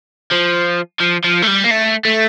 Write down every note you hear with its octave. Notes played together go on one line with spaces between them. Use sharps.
F3
F3
F3
A3
G3
A#3
A3
A3